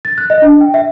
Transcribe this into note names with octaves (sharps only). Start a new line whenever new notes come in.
A6
F#6
D#5
D4
G5
E5